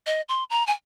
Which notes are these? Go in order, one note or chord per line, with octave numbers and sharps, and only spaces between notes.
D#5
C6
A#5
G#5